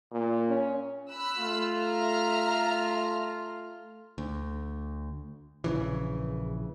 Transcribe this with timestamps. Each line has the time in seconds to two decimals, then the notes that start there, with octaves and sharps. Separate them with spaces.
0.12 A#2
0.49 C#4
1.11 B5 E6 F#6
1.39 A3 F4
1.77 E5 A#5 F6
4.18 D2
5.64 A#1 C#3 E3